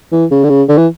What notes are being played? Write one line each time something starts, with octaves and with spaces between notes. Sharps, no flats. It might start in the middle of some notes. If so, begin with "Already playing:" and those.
E3
C#3
D3
C#3
D3
E3